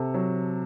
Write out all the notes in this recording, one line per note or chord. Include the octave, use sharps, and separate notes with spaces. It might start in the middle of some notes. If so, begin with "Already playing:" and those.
Already playing: C3 A4
F#3